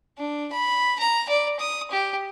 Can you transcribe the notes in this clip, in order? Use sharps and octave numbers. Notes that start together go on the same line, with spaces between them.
D4
B5
A#5
D5
D#6
G4